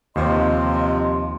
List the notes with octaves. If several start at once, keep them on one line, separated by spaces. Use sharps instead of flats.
D#2 C3 F3 D#5 C6